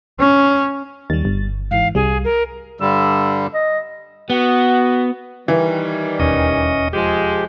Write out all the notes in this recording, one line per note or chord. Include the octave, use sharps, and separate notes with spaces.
C#4
D#2 G3 A6
G1
G#2 E3 F5
C2 G3 G#4
A#4
G2 D3 G3 E6
D#5
B3 F#4
D#3 E3 G3
E1 D#2 C#4 D#5
F3 G#3 G4